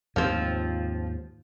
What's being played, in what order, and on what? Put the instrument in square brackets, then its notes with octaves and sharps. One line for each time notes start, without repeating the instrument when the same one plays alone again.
[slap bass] D#2 G#2 [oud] F3 C4